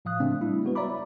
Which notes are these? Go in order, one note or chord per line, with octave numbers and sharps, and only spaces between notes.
A2 F3 F5 D#6 F#6
C#3 A3 C4 D4
G3 D4 E4
G#3 B3 F#4 B4
C#5 D5 E5 A#5 B5 D6